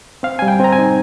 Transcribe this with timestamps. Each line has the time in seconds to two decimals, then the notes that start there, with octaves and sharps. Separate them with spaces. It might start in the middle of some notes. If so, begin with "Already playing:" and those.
0.23 C4 F5
0.39 G3 G#5
0.48 G5
0.60 C4 A#5
0.73 G#5
0.79 D#4